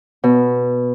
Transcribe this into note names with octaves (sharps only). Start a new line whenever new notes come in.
B2